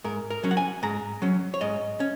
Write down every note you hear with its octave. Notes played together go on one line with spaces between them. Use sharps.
G#2 A#4
A#4
F#3 C#4
F#5
G#5
G#2 A#5
F#3 C#4
C#5
G#2 D#5
C#4